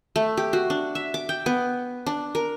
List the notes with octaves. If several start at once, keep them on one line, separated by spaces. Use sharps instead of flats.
A3
G4
F#4
D4
E5
D6
G5
B3
D4
A#4